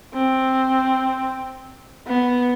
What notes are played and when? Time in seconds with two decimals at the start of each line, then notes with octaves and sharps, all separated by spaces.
0.14 C4
2.07 B3